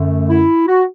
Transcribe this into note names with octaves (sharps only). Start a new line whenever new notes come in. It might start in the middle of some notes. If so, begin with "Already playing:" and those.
Already playing: F#2 D3 A3
E4
F#4